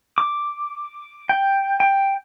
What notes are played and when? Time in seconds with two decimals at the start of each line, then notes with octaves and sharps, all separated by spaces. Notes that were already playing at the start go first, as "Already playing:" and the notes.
0.18 D6
1.29 G5
1.80 G5